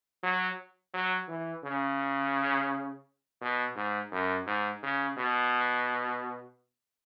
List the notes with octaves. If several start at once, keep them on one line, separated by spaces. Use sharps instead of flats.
F#3
F#3
E3
C#3
B2
G#2
F#2
G#2
C#3
B2